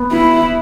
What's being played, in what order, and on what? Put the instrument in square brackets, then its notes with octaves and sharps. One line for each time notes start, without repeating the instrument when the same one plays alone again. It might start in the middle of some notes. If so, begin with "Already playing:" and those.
Already playing: [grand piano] B3
[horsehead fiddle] E4